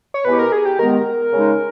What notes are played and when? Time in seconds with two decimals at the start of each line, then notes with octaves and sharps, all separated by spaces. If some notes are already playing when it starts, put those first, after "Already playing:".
0.14 C#5
0.25 B2 G#3 B3 E4 G4 B4
0.39 A#4
0.52 G#4
0.65 G4
0.79 D#3 G#3 B3 A#4
1.33 C#3 G#3 D#4